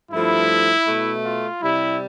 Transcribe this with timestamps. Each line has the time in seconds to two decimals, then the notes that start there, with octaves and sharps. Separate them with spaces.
0.11 G2 F3 A3 E4
0.87 B2 A3
1.24 F4
1.61 C3 G3 E4